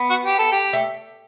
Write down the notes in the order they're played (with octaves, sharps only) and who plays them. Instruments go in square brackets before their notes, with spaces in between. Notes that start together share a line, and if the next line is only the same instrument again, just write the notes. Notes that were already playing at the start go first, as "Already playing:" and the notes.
Already playing: [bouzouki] B3
[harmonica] F#4
G4
A4
G4
[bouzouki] A3